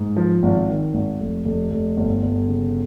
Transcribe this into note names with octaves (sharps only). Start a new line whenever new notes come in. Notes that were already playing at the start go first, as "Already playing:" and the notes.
Already playing: G#2
F3
G#1
D#3
G#1
F1
F1
F1
G1
G1
C#3